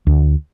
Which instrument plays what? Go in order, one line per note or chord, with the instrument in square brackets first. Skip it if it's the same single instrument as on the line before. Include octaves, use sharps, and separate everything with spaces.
[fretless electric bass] D2